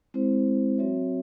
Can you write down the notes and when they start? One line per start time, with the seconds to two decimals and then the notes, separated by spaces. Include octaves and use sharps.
0.14 G#3 C4 E4 C5
0.78 F#3 C4 F#4 C#5 E5